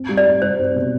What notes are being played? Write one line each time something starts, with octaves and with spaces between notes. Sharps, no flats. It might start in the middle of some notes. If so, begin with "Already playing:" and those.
Already playing: C4
G3
D5
G3
G3 C5
C4
B2